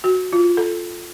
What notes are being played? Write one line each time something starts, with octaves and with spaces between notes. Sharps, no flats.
F#4
F4
A4